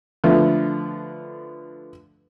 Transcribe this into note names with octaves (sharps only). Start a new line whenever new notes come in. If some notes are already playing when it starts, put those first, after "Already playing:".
D3 F3 A3 B3